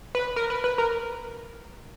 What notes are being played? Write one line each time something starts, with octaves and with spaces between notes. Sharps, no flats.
B4
A#4
B4
B4
A#4